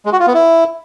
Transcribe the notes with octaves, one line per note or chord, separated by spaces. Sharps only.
G#3
F#4
F4
B3
E4